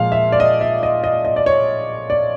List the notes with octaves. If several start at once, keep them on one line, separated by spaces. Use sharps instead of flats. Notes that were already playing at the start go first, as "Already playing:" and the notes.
Already playing: A#2 F3 G#3 F5
E5
D5
D#5
E5
D#5
D#5
D#5
D5
C#5
D5